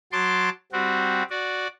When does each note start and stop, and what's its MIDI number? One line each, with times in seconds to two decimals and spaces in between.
0.12 0.49 54
0.12 0.49 81
0.12 0.49 84
0.12 0.49 86
0.72 1.23 55
0.72 1.23 60
0.72 1.23 66
1.30 1.67 66
1.30 1.67 74